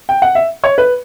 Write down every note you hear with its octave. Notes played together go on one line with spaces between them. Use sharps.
G5
F#5
E5
C#5
B4